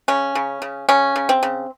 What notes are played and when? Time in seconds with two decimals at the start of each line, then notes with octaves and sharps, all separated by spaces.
0.08 C#3 C#4
0.35 C#3
0.62 C#3
0.89 C#3 C#4
1.16 C#3
1.29 C4
1.43 C#3